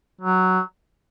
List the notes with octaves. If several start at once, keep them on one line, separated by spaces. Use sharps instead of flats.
F#3